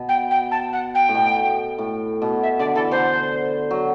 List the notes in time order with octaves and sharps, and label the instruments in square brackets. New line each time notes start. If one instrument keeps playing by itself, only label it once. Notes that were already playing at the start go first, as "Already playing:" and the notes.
Already playing: [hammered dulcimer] B2
[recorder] G5
G5
A5
F#5
G5
[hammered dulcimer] A2
B2
A2
B2
[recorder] E5
[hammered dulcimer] D3 [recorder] D5
[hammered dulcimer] E3 [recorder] A4
[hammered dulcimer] D3 [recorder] C5
[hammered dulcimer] F#3